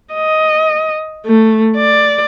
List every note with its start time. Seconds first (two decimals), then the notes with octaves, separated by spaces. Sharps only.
0.15 D#5
1.26 A3
1.77 D5